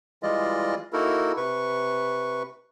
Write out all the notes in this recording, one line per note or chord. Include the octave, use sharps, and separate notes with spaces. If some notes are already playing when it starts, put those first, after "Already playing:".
E3 G3 G#3 F4 D5 D#5
A#3 D#4 E4 F#4 A4 A#4
C3 B4 C#6